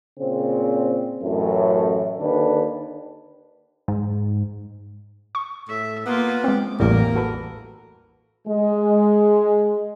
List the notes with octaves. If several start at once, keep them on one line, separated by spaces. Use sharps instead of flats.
A#2 C#3 C4
A1 F#2 A2 A3
D#2 D3 D4 B4
G#2
C#6
A2 E5
A#3 B3 F4
G#3 C4 D6
A1 E2 A2 G3 A#3 A#4
F#4 A4 B4
G#3